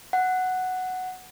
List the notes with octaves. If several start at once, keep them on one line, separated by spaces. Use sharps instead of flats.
F#5